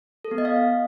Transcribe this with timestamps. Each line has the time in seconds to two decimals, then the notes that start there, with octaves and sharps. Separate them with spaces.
0.25 A4
0.31 B3
0.38 D#5
0.45 F5